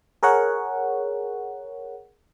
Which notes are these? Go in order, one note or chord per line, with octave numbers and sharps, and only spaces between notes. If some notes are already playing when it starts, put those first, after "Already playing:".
G#4 A#4 C#5 F#5